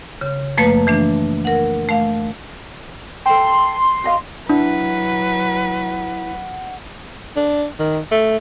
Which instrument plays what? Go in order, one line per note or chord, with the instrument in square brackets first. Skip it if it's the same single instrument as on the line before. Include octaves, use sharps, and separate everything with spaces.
[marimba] C#3
F#2 F3 A3 A#3 B4 A5
E3 A3 D4
A#4 F#5
A3 F5
[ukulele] A4 G5 [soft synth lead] C6
[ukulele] F#4 D#5 F5
[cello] F#3 B4 [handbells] D4 [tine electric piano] E4 [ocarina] F#5
[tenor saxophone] D4
D#3
A3